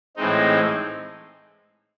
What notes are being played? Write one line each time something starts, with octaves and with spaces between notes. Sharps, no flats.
A2 E3 G#3 C4 D#4